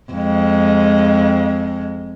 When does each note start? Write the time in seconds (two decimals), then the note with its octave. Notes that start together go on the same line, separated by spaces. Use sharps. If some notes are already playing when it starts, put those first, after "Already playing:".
0.12 F2 G#3